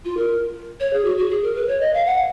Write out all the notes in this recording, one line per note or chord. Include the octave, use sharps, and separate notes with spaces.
F4
A#4
C#5
G#4
F#4
F#4
G#4
A#4
B4
C#5
D#5
F5
F#5